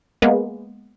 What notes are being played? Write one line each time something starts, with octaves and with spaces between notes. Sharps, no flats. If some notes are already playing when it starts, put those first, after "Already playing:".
G#3 A#3 B3